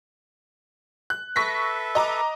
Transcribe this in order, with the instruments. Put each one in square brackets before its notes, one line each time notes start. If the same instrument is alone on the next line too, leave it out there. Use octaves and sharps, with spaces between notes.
[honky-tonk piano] F#6
[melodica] A4 B4 E5 [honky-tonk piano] C#6 A#6 B6
[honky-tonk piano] D#5 A#5 D6